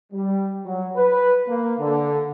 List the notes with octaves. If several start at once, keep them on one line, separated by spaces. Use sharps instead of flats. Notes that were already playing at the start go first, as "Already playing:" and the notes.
G3
F#3
B4
A#3
D3